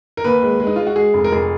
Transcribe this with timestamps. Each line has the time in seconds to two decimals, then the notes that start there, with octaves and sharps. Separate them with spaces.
0.17 A#4
0.24 D#2 B4
0.42 G#3
0.60 G#3
0.67 D#4
0.76 G#3 F4
0.87 F#4
0.96 G#3 G#4
1.14 F1
1.24 A#4
1.32 F1 G#4